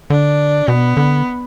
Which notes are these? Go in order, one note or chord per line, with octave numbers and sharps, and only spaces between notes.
D3 D4
B2 B3
D3